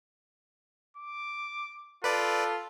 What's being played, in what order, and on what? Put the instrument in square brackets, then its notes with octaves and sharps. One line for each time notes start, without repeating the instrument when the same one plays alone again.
[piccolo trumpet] D6
[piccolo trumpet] F4 [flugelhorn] A4 [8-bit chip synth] B4 D5